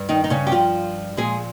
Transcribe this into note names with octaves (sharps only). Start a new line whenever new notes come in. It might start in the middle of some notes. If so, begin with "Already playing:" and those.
Already playing: G2
D#3 D#4
D#4
C#3 C#4
G4
F3 F4
A#2 F3 G#3 G#4